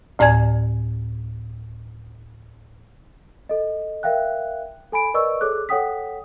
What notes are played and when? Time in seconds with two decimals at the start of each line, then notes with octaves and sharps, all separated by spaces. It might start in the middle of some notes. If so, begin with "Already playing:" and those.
0.19 D2 A2 D5 G#5 G#6
3.49 A4 D#5
4.03 A#4 E5 F5 G5 F#6
4.92 A4 G#5 B5 D7
5.14 A#4 B4 D5 D#5 C#6 E6
5.41 G#4 A4 C#5 D6 F#6
5.69 A4 C#5 F#5 G5 D#6 B6